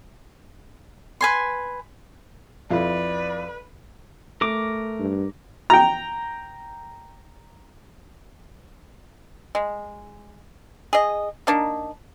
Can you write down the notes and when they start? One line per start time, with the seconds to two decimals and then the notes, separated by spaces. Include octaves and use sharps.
1.21 B4 G#5 C6
2.71 F2 E4 F4 B4 D5
4.41 A3 A#4 D6
5.00 G2
5.70 G5 A#5
9.55 G#3
10.93 G#4 D#5
11.47 A#3 D4 D#4